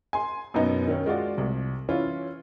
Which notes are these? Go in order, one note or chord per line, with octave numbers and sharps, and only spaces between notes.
G#5 C6
F#2 B2 B3 D#4
D#3 C#4
G#3 F4 F#4 D5
C2
E3 C#4 F4